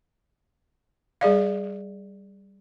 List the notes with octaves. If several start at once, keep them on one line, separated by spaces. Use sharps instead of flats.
G3 G#4 D5 F5